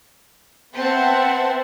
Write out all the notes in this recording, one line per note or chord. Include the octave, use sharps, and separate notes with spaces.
B3 C4 C5 E5 F#5 A5